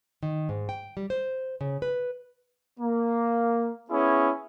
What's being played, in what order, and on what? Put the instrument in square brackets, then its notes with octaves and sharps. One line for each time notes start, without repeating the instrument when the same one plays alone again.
[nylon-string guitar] D#3
G#2
G5
G3
C5
C#3
B4
[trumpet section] A#3
B3 C#4 E4 G#4